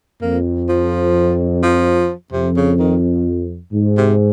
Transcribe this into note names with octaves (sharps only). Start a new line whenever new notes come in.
F2 A#3
F3
F3
F2 C3
C#3
D#3
G#2
C3